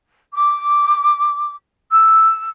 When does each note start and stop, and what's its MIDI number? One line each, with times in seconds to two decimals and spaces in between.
0.34 1.54 86
1.91 2.48 88